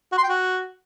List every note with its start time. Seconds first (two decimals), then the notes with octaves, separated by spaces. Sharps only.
0.12 F#4
0.18 C6
0.23 G5
0.29 F#4